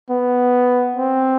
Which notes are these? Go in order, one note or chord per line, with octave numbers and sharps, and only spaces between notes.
B3
C4